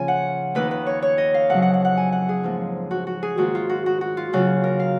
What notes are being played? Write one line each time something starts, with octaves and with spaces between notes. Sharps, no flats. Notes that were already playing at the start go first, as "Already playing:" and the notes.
Already playing: C#3 F3 A#3 C#4 F4 G#5
F#5
D#2 D#3 A#3 D#4 B4
B4
C#5
C#5
D#5
F5
F2 C#3 F#3 F#5
F#5
F#5
F#5
G#5
F#5
G#4
G#2 F3 A#3
F#4
F#4
G#4
G#2 D#3 A#3 F4 F#4
F4
F#4
F#4
F#4
F4
D#2 C#3 F#3 C#4 F4 F#4
A#4
F5